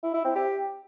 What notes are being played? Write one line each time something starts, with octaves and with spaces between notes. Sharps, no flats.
E4
E4
C4
G4